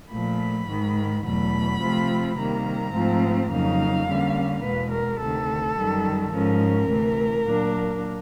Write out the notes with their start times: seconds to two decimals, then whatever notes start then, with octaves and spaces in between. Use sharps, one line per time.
0.11 A#2 F3 A3 B5
0.68 G#2 D#3 G#3
1.24 E2 B2 F#3 A3 B5
1.81 C3 F3 A3 C4 F4
2.37 C3 D#3 G3 A#3 A#5
2.94 G#2 F3 A3 C4 F4
3.50 F2 C#3 F#3 A#3 D#4 F5
4.07 D3 G3 A#3 C#4
4.63 E2 B2 G#3 B4
4.91 A#4
5.20 D2 C3 D#3 A4
5.76 F#2 D#3 G3
6.33 G#2 F3 G#3 C#4 A#4
6.89 D2 C3 E3 A3
7.45 A#2 F#3 A#3 D4